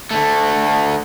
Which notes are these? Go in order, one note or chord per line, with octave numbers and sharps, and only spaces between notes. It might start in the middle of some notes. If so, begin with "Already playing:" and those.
D3 A3